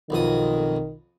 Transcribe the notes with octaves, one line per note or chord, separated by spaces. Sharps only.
B1 F2 D#3 D#6